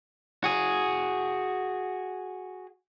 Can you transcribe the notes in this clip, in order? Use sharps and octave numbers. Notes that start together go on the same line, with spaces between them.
F#4 G#4